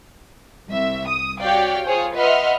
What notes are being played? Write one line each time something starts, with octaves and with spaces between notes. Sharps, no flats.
C2 E5
D#6
F#4 G4 C#5 D5 F5 G5
F4 G#4 C5 C#5
B4 D#5 E5 F#5 C6 F6